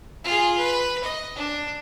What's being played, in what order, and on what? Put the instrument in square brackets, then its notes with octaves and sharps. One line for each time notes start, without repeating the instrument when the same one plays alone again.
[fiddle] F4 G#4
B4
D#5
D4